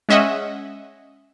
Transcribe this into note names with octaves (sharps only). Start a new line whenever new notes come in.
G#3 C#4 D#5 E5 F#5